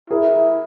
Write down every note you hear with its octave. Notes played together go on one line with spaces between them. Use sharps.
E4 G#4 A#4